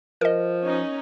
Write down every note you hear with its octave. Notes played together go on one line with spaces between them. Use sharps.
F3 A#4 D#5
C#4 D#4